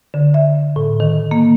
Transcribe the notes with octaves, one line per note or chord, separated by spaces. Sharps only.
D3
E5
A2
D#3
A#3